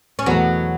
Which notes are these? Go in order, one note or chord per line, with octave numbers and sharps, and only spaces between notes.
C#4
E2 B2 F#3 A3 B3